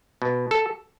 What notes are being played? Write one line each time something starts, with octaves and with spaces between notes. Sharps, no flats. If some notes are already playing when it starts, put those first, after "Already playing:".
B2
A4